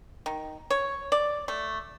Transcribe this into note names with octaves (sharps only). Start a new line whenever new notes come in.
D#3
C#5
D5
A3